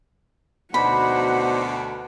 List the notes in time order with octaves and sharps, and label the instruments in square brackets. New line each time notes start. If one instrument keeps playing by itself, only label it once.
[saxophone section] D2 B2 [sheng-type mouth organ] D4 D#4 C5 [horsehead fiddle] F#5 [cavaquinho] B5